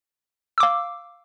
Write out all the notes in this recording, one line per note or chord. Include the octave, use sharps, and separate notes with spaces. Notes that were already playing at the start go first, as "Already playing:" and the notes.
F5 D6 E6